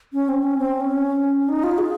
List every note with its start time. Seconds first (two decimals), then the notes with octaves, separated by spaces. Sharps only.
0.13 C#4
0.28 C4
0.43 C#4
0.58 C4
0.81 C#4
1.48 D#4
1.64 F4
1.78 G#4